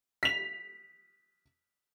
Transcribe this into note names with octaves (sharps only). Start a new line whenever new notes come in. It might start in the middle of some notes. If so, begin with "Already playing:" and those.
B6 F7